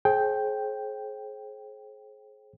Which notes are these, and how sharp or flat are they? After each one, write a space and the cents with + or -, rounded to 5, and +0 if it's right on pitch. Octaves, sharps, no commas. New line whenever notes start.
G#4 +35 C5 +40 G5 +0